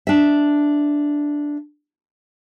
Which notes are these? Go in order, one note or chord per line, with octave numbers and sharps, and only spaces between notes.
D4 E5